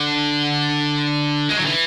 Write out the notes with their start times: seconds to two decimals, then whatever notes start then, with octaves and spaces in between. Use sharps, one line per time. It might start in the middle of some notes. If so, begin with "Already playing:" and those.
Already playing: D3
1.49 G#3
1.56 F#3
1.65 E3